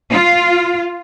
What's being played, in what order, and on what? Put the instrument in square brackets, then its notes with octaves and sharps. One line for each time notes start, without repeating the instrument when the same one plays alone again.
[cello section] F4